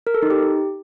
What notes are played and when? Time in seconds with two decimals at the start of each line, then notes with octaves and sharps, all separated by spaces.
0.07 A#4
0.15 A4
0.22 D#4
0.30 G4